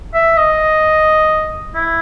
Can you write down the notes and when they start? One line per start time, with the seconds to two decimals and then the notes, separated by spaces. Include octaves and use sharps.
0.14 E5
0.37 D#5
1.75 E4